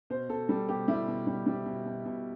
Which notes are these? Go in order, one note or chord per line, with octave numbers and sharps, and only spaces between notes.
B2 C5
B2 A4
G3 A4
B2 G4
G3 E4
B2
G3
G3
B2
B2
B2